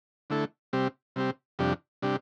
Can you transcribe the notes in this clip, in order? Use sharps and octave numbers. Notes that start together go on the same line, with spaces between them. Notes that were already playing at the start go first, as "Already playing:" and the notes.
D3 A3 E4 A4
C3 G3 C4 G4
C3 G3 C4 G4
F2 C3 G3 D4 G4
C3 G3 D4 G4